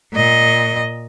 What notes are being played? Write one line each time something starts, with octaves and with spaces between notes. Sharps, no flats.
A#2 D#5